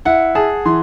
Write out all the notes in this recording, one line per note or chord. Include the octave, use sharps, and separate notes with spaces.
E4 F#5
G#4 A5
E3 C6